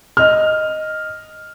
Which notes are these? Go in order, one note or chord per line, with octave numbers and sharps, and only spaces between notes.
D#5 F6